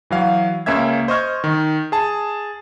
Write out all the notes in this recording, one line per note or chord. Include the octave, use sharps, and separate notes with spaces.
E3 F#3 F5
C#2 A#3 C#4 E5 G#6
C5 D#5 C#6 F6 G#6
D#3
G#4 A5